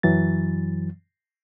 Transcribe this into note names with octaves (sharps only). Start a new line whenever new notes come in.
F#2 E3 F#3 A6